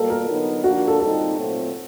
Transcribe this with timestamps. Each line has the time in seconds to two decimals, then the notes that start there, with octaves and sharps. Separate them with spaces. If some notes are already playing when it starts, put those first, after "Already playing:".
Already playing: B2 G3 A#3 A4
0.10 A#4
0.29 D3 F#3 B3 D#4
0.64 F3 A#3 D4 F#4
0.88 A4
1.00 A#2 G3 C4 D#4 A4
1.36 A#2 F#3 A3 C4